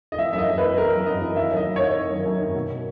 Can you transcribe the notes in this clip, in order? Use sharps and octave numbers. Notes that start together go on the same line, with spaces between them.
D#5
E3 E5
F#2 E5
D#5
F#2
E3 B4
E3 A#4
F#2
F#2 D#5
E3
D#3 E5
F#2
D#5
F#2
D#3 C#5
D#3
F#2
F#2
D#3
B2